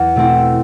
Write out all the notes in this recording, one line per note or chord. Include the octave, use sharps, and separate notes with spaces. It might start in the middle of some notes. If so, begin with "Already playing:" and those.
Already playing: E2
B2 A3 C4 E4